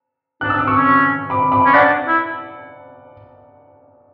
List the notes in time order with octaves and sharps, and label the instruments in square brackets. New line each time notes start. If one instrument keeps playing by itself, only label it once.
[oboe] D4 [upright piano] F#6
[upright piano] E6
D6
C#6 E6
[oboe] C#4
[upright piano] B5 D6
B5 D6
[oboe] C#4
[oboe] D4 [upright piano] D5 F#5
[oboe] E4